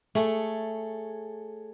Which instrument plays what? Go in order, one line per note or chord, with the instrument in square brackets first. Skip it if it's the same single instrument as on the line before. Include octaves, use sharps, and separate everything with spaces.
[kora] A3 [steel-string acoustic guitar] G#4 A4 C#5